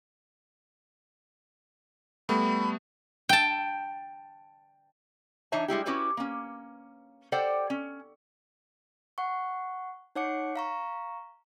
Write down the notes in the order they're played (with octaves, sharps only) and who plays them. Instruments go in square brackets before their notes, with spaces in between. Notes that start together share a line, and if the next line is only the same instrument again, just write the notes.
[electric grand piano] G3 A3 B3 [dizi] B5
[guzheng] G5 A5
[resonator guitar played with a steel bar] E3 D4 D#4 C#5 E5 A5
G3 G#3 E4 G4
C#4 E4 F#4 G4 B4 C#5
A#3 C#4
G4 A4 C5 D5 F#5 G5
C#4
[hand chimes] F#5 C#6
D#4 C#5 F#5 D6 C#7
F5 A#5 C#6